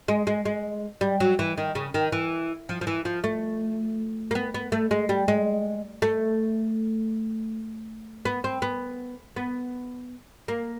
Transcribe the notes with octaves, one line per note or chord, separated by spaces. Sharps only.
G#3
G#3
G#3
G3
F#3
E3
D#3
C#3
D#3
E3
F3
F3
E3
F3
A3
A#3
B3
B3
A3
G#3
G3
G#3
A3
B3
C4
B3
B3
A#3